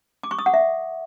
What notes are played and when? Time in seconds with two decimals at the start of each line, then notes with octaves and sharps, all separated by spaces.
0.23 D6
0.31 C#6
0.39 D#6
0.46 F#5
0.54 E5